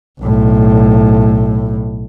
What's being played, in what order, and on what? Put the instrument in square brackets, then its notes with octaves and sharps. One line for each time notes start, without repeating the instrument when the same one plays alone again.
[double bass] B1 A2